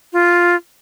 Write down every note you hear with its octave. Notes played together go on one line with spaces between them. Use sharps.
F4